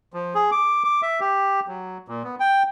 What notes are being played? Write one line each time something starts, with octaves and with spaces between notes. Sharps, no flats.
F3
G#4
D6
D6
E5
G4
F#3
A#2
B3
G5